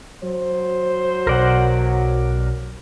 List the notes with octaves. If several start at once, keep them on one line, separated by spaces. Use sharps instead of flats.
F#3 C5
B1 A#4 D5 F#5